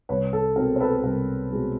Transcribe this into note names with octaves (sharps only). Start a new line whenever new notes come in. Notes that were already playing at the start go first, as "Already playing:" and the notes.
C2 B4 C#5
A4
B2 G#3 C4 A#4
C5
A4 B4
A4
C2 A#4
B2 G#3 C4